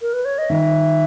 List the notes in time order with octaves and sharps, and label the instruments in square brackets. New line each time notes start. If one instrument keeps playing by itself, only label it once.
[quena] A#4
B4
C#5
D#5
[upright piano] D#3 [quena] E5